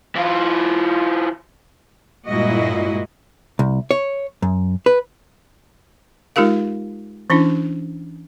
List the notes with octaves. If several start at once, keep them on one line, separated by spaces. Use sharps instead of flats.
E3 F4
G2 A#2 G#3 E4 F#4 D#5
C2
C#5
F#2
B4
G#3 D#4 F4 G4 A#4 F5
E3 C#4 D4 E4